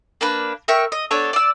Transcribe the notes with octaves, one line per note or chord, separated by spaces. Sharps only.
A#3 D4 B4
A#4 E5 G5 C#6
D#5
B3 D4 A4 C#5
D5 E6